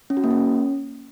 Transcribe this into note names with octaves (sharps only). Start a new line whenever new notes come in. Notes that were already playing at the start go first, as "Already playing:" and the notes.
C#4
F#4
A#3
C#4